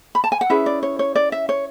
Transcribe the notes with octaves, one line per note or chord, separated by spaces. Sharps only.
B5
A5
G#5
F#5
C#4 E4 G#4 B4 E5
D5
C#5
C#5
D5
E5
C#5